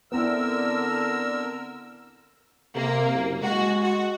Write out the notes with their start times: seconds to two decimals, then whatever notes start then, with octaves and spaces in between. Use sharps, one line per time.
0.12 D3 B3 C4 E4 A#4 E6
2.75 C3 A#3
3.13 F#1
3.42 G#3 F#4
3.82 F#4